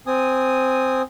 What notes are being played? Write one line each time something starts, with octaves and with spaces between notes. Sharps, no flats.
C4 G#5 D#6